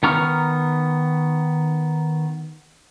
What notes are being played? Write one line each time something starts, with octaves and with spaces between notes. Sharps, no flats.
D#3 B3 A#5 C#6 F6